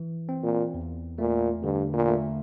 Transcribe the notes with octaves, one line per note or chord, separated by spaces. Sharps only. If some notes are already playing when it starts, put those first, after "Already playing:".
Already playing: E3
C4
A#2
E2
A#2 A3
G2 D3
A#2
A3